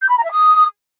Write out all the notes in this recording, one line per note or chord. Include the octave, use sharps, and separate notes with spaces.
G6
B5
A#5
E5
D#6